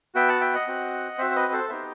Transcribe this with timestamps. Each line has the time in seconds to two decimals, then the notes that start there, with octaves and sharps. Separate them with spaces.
0.15 B3 F#4 E5 G5
0.29 F#5 A5
0.41 E5 G5
0.54 D#5 F#5
0.67 C4 F#4
1.18 C4 F#4 C5 E5
1.31 C5
1.36 B4 D#5
1.53 A4 C5
1.69 B3 D#4 G4 C5 E5